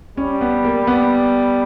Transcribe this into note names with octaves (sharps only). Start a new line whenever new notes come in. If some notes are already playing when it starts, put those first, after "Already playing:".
G3 C#4
B3
A#3
B3